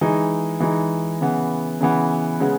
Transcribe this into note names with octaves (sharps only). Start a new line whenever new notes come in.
E3 G#3 D#4
E3 G#3 D#4
C#3 E3 B3
C#3 E3 B3
C#3 G#3 B3